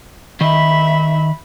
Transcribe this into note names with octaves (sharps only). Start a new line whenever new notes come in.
D#3 D#5 E5 B5